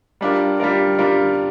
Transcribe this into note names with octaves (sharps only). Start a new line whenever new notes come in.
G3 D4 F4 A#4
G3 D4 F4 A#4
G3 D4 F4 A#4